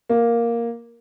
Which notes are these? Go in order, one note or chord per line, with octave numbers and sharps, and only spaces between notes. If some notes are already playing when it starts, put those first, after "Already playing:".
A#3